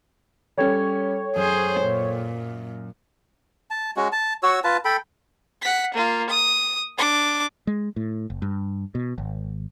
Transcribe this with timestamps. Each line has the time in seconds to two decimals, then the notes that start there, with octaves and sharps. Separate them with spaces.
0.58 G3 C#4 A4 C#5 G5 G#6
1.36 F#2 G#4 C5
1.81 A#2
3.70 A5
3.97 G#3 C#4 F#4
4.12 A5
4.43 F#4 C#5 E6
4.64 F4 B4 A5
4.85 A4 G5 B5
5.62 F#5 B6
5.94 A#3 F4
6.29 D#6
6.98 D4 D6
7.67 G#3
7.96 A2
8.30 F#1
8.42 G2
8.95 B2
9.18 G#1